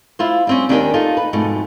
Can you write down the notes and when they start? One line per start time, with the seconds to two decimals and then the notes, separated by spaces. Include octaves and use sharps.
0.19 E4 F4 C5
0.47 G3 C4 C#4
0.69 D#2 D4 D#4 G4 A#4 G#5
0.94 D#4 F4 A4
1.17 B4
1.33 F2 G#2 B2 A3